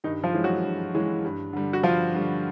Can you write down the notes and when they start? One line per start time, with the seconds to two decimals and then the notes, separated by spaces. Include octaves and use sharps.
0.04 G2 D#3 D#4
0.24 F3 F4
0.34 E3 G#3 C#4 E4
0.44 F#3 F#4
0.64 G2
0.94 E3 G#3 C#4 E4
1.24 G2
1.53 D3 G3
1.73 F#4
1.83 G2 F3 F4
2.14 D3 G3